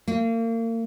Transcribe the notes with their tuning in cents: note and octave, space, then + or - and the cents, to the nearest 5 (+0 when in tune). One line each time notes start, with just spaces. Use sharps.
A#3 -35